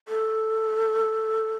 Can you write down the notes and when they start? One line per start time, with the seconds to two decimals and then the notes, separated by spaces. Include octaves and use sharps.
0.08 A4